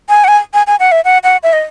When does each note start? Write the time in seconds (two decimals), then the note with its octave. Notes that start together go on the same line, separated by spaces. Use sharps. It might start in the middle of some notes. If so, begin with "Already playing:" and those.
0.09 G#5
0.24 F#5
0.28 G#5
0.54 G#5
0.67 G#5
0.80 F#5
0.92 E5
1.05 F#5
1.24 F#5
1.43 E5
1.53 D#5